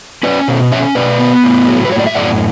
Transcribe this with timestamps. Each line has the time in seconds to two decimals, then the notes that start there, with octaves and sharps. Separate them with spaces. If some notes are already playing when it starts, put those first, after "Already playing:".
0.23 C#4 B4 D5
0.48 B2
0.72 C#4 C#5 E5
0.95 B2 B4 D5
1.19 B3
1.44 A2
1.67 F#3
1.85 B4
1.91 A2 C#5
1.99 D5
2.07 E5
2.14 F#2 D5 F#5